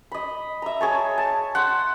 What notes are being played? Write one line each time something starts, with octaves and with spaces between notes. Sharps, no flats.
D#5 B5
E5 A#5
G#4 C#5 A5
A5
C5 F#5